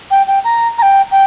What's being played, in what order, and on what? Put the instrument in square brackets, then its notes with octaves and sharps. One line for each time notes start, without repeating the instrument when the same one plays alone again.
[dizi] G5
G5
A#5
A#5
G5
G5